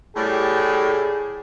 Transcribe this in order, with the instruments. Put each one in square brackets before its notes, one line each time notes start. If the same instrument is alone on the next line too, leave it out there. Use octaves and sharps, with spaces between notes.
[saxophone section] A2 G3 [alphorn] G#4